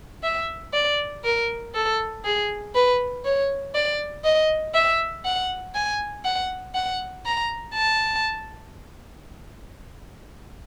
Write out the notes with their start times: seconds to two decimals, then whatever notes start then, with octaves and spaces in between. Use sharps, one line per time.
0.23 E5
0.73 D5
1.24 A#4
1.75 A4
2.24 G#4
2.75 B4
3.25 C#5
3.75 D5
4.24 D#5
4.74 E5
5.25 F#5
5.75 G#5
6.25 F#5
6.75 F#5
7.26 A#5
7.75 A5